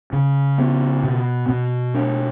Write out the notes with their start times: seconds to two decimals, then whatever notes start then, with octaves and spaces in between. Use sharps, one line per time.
0.13 C#3
0.58 B3
1.03 B2
1.49 B2
1.94 D4